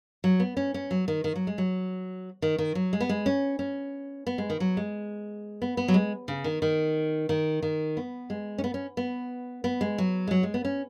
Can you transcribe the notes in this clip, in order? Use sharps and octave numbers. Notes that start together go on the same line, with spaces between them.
F#3
B3
C#4
C#4
F#3
D#3
D#3
F#3
G#3
F#3
D#3
D#3
F#3
G#3
B3
G#3
C#4
C#4
B3
G#3
D#3
F#3
G#3
B3
B3
F#3
G#3
C#3
D#3
D#3
D#3
D#3
B3
G#3
C#4
B3
C#4
B3
B3
G#3
F#3
G#3
F#3
G#3
B3
C#4